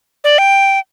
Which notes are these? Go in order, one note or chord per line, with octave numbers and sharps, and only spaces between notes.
D5
G5